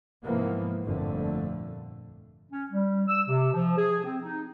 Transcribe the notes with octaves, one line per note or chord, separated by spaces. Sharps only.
G#2 C3 E3 F3 A#3 B3
G1 F2 A#2 D3 A3
C#4
G3
E6
C3
F3
G#4
C4
D#4